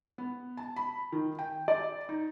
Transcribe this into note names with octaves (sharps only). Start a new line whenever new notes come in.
B3
A5
B5
D#3
G5
D5
D#4